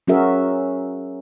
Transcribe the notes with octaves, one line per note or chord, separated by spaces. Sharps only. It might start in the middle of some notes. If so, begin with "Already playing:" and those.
F#3 C#4 F#4 G#4 A#4 E5